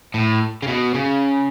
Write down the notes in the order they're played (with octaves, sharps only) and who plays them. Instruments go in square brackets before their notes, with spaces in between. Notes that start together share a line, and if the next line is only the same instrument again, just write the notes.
[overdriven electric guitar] A2
C#3
B2
C#3